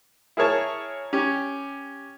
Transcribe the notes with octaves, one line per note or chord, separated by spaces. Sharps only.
E4 G#4 A#4 C#5 A5
C#4 G4